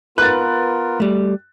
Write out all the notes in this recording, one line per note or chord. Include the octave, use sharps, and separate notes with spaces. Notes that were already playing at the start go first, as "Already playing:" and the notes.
B3 F4 A#4 B4 F#6 A6
G3 A3